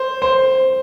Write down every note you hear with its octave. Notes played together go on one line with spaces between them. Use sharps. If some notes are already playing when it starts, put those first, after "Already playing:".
Already playing: C5
C5